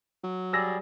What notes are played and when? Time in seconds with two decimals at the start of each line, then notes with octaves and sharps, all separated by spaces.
0.24 F#3
0.53 G3 G#4 D5 E6 A#6